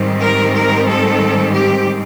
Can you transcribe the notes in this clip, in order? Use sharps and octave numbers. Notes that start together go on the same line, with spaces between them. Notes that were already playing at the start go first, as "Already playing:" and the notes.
Already playing: G#2 D#3 G3 C4
A#4
A#4
A4
G4